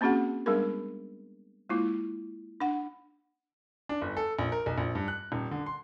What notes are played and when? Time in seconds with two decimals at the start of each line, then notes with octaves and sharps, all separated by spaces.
0.01 A#3 C4 C#4 F#4 G#4 F#5
0.46 G3 G#3 B3 D4 G#4 A#4
1.69 G#3 A#3 E4 F4
2.61 D4 F#5
3.89 D4
4.01 G1
4.17 A4
4.39 A#1
4.52 A#4
4.66 B1
4.78 A#1
4.95 G2
5.08 F#6
5.32 D#1
5.51 D3
5.66 C6